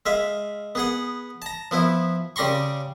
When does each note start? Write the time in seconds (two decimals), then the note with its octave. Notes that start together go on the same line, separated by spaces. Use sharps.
0.06 G#3 E5 F5
0.75 B3 G#4 F#5
1.42 A5 A#5
1.71 F3 B3 E4
2.36 C#3 G3 G4 A#5 C6 C#6